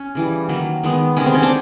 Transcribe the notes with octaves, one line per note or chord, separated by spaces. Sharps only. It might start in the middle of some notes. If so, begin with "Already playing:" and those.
Already playing: C#4
C#3 E3 G3
D#3 F#3 A#3
D#3 G#3 B3
C3 D#3 G#3 B3 C#4
C4
C#4
C4 D4